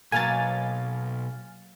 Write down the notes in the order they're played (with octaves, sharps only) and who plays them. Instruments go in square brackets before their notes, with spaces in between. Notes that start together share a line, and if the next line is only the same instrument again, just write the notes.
[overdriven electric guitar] B1 [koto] F#3 A#3 [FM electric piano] G#5 F6 A6